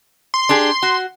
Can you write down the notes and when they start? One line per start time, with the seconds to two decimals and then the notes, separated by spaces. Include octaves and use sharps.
0.34 C6
0.49 D4 G4 G#4
0.83 F#4